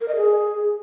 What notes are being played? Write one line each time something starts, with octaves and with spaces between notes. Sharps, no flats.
A#4
D#5
G#4